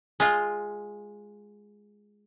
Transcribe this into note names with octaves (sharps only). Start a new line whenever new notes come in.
G#3 F4